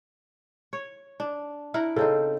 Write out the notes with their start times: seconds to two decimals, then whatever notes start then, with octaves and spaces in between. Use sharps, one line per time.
0.73 C#5
1.20 D4
1.74 E4 A#4 F#5
1.96 C#3 C4 D#4 A4